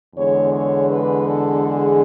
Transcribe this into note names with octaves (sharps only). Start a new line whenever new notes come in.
E2 D3 G#3 C#5
C#5
B4
A4
G#4